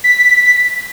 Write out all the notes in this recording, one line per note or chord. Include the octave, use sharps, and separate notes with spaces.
B6